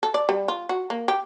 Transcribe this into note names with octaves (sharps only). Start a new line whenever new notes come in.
A4
D5
G3
F4
F#4
A#3
G4